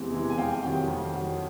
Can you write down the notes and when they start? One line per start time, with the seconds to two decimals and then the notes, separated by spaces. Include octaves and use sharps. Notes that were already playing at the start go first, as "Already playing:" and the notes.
Already playing: E2 C3 E3 G#3
0.12 C3 E3 G#3
0.30 G#5
0.37 F2 F5 G5
0.63 C3 D#3 F#3 F5 G5
0.88 F2
1.13 C3 D#3 F#3